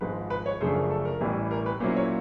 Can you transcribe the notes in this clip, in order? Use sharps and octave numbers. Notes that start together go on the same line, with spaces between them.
G#1 G#2 F3 B4
B4
C#5
F#2 C#3 F3 A3 D4 C5
A#4
A4
A#4
A1 A2 E3 G3
A#4
B4
A#2 F#3 A#3 C#4 E4 C5
C#5